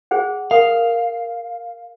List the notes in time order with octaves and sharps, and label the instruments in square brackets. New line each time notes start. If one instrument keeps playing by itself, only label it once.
[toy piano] G#4 C5 F#5
[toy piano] A#4 D#6 [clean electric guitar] F5